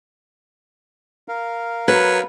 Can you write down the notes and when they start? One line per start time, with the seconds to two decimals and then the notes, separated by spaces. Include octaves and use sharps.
1.28 A#4 F5
1.88 F#3 B4